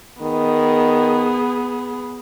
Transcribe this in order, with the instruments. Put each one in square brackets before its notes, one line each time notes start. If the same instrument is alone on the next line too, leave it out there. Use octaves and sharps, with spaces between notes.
[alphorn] D#3 [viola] B3 G#4